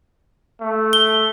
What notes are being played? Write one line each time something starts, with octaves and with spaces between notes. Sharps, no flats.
A3
G7